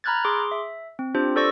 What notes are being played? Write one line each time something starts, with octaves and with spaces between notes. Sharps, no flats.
A#5 B5 F6 F#6 G#6 A6
G#4 C6 D6
E5
C4
D4 F4 G4 C5
A4 C5 D5 C#6 E6 A#6